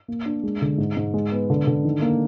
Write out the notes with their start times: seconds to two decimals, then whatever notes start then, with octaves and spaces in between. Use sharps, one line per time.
0.08 A#3
0.25 D4
0.43 G#3
0.62 D3
0.78 G#2
0.97 G#2
1.14 G#3
1.32 B3
1.50 D3
1.67 D3
1.85 D#3
2.02 A#3